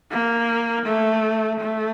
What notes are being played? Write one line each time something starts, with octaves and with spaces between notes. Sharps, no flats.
A#3
A3
A3